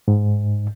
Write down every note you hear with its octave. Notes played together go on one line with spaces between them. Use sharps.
G#2